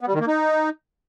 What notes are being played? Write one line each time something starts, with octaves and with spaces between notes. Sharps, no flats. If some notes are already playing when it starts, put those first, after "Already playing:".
B3
G3
D#3
A#3
D#4